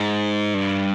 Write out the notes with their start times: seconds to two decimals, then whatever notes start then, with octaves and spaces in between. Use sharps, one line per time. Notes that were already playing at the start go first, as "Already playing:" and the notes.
Already playing: G#2
0.54 G2